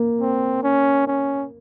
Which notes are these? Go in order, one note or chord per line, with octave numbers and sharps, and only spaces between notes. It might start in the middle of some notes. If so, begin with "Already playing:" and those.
Already playing: A#3
C4
C#4
C#4